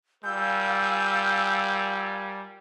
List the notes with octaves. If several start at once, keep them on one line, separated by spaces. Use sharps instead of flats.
G3 F4 A#4 F5 G#5 E6 G6